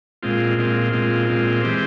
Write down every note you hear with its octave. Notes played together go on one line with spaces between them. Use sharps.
A#2 G#3 C4 F4
A#2 G#3 C4 F4
A#2 G#3 C4 F4
A#2 G#3 C4 F4
E3 G#3 C4 G4 C5